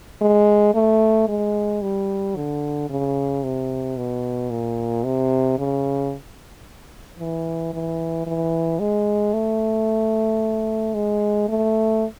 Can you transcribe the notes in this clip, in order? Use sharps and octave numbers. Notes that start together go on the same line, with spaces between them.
G#3
A3
G#3
G3
D3
C#3
C3
B2
A#2
C3
C#3
E3
E3
E3
G#3
A3
G#3
A3